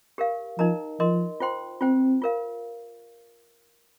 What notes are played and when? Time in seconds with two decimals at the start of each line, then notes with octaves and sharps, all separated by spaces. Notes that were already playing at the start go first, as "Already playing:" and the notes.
0.18 G4 A#4 F5
0.58 F3 D#4 A#4 D#5 A#5
1.00 F3 A#4 D#5 C6
1.40 F4 C5 G5 C6
1.81 C4 F4 C5 G5
2.22 F4 A#4 F5